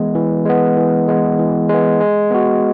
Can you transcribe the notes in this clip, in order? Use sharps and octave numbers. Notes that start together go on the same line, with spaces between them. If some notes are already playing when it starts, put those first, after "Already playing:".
Already playing: E3 G#3 B3
E3
G#3 B3
E3
G#3 B3
E3
G#3 B3
G#3
B3 F#4